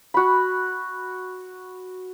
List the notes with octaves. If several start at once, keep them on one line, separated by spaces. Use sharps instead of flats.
F#4 B5